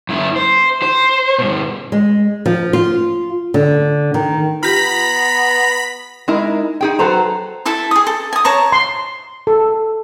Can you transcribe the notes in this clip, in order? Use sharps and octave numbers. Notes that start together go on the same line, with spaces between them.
F#2 E4
C5
C5
G2 B2
G#3
F3
F4
D3
D#3
B3 F4 G4 A#5 B5 B6
G#3 D#4 E4 A#4
D#4 G#4 G5
F#3 A4 B4 C5 A#5
E4 A4 E5 A5
G#4 D#6
A4
G#5 D#6
C#5 A5 A#5 C#6
C6
A4